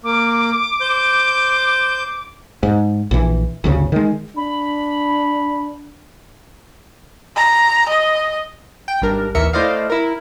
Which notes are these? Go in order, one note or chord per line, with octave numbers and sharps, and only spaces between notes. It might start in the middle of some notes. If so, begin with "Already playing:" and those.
A#3 D6
C5 G6
G#2
A#1 E3
G1 D2 C#3
D#3 G#3
D4 B5
A#5
D#5
G5
G#1 G3 D4 A#4
A1 D#2 E3 A#4 E5 C#7
A3 E4 C5 D5 D#5 F5
E4 A#4